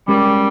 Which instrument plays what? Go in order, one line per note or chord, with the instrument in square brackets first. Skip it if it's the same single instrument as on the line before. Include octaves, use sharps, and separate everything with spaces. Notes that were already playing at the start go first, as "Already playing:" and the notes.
[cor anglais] G3 [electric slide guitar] G#3 C#4 G4 A#4